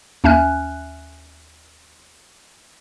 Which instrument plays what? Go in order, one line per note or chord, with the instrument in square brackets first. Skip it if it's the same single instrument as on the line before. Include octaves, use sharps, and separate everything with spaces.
[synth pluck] D#2 C#4 E5 G#5 F6 F#6